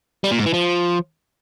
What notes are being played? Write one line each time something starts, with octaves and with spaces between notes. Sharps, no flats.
G3
A#2
G#2
E3
F3